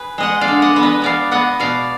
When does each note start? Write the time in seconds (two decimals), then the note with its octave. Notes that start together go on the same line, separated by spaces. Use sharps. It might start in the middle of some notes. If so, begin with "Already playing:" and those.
Already playing: G#4 B4
0.18 G#3 D#5 F#5
0.41 D5 F5
0.48 D3
0.62 D#5 F#5
0.76 B3
0.83 B4 D#5
1.02 B3 D5 F5
1.31 B3 D#5 F#5
1.60 B2 D5 F5